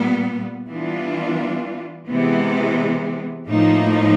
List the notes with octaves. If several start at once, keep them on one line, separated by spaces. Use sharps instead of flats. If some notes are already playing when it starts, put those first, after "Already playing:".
Already playing: A#2 G3 B3
E3 G3 B3 D4 F4
C3 E3 G#3 B3
A2 F3 A#3 D#4